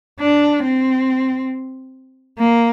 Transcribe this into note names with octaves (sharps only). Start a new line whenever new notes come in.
D4
C4
A#3